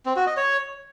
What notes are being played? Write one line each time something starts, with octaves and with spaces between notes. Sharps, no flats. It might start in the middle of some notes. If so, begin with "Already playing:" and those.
C4
F#4
D#5
C#5